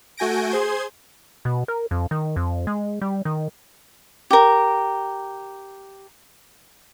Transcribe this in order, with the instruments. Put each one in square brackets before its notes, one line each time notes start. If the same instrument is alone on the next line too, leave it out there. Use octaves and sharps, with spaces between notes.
[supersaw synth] A3 F#4 G#5 G6 A#6 D7
G#4 C5 C6 G#6
[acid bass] B2
A#4
F2
D#3
F2
G#3
G3
D#3
[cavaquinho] G4 A#4